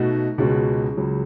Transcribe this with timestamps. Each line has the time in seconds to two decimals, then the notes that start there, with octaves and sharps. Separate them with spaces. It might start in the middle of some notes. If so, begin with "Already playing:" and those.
Already playing: B2 A3 D#4 F#4
0.38 C#2 B2 G#3 C#4 F#4
0.97 C#2 C#3 F#3